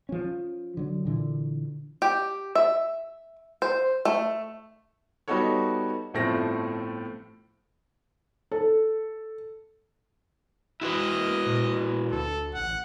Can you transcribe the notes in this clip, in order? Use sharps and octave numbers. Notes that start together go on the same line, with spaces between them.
F3 C#4
D3 F#3
A#2 D3 E3
G4
E5
C5
A3
G3 B3 D#4 F#4 A4 C#5
G1 A2 F3 A3 C4 A#6
A4
E4 F#4 B4 D#5
A#3
A#2
D2 A4
A1 F#5